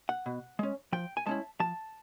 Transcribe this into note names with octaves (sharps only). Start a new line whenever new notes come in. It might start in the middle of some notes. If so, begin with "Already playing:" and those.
F#5
B2
G#3 C#4
F3 G5
G#5
G#3 C#4 E4 A5
F3 A5